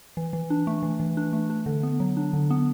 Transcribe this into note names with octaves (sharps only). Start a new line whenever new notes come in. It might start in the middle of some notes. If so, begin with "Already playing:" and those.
E3
E3
D4
A3
E3
E3
D4
A3
D4
D3
B3
F#3
D4
D3
B3